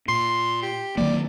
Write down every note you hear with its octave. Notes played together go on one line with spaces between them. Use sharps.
A#2 C6
G4
D#3 F#3 A#3 D5